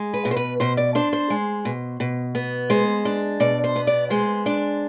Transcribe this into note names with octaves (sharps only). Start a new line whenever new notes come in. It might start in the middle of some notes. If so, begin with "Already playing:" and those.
Already playing: G#3
B4
B2
C5
B4
B2 C5
D5
D4 C5
C5
G#3
B2
B2
B3
G#3 C5
D4
B2 D5
C5
B3
D5
G#3 C5
D4